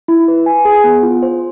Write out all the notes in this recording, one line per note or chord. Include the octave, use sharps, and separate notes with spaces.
E4
B4
G#5
G#4
B3
F4
C5